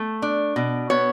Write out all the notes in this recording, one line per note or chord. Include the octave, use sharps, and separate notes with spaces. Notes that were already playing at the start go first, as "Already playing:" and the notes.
Already playing: A3
D4
B2
B3 C#5